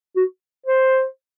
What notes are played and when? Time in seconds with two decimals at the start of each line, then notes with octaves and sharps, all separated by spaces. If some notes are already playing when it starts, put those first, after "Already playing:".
0.16 F#4
0.66 C5